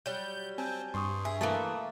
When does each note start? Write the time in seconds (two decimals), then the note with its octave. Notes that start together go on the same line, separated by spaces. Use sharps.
0.06 F#3 G3 G6
0.58 C4 G#5 A5 G6
0.94 G2 C6 C#6 D#6
1.25 G#4 E5
1.41 E3 A3 A#3 E5 A5 D#6